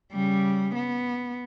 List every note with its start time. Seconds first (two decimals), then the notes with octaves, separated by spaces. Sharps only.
0.13 C#3 G3
0.75 B3